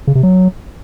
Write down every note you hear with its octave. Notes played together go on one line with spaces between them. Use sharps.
C#3
C3
F#3